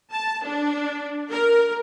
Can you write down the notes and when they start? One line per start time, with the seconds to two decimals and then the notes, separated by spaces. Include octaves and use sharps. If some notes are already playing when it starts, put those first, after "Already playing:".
0.12 A5
0.44 D4
1.31 A#4